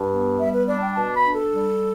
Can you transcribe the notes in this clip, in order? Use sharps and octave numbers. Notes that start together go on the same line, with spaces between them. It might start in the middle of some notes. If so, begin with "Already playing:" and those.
Already playing: G2
B3
G3 E5
B4
D4 D5
A5
G5
B2 A5
B5
D4
A4
G3